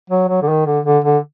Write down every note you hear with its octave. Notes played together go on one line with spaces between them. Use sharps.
F#3
F#3
D3
D#3
D3
D3
D3